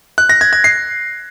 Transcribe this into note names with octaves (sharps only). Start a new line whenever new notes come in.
F#6
A#6
G#6
G#6
C7